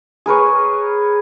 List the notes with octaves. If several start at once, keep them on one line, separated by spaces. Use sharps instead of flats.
G#4 A#4 B4 C#5